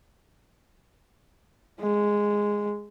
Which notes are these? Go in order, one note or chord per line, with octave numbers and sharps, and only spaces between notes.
G#3